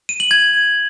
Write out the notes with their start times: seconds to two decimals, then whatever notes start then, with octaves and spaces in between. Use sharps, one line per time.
0.09 D#7
0.20 F#7
0.31 G#6